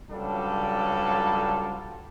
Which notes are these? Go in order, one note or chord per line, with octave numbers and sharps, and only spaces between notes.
C#2 F#3 G3 D4 F4 A4